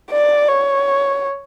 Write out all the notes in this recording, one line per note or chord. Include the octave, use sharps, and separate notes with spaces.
D5
C#5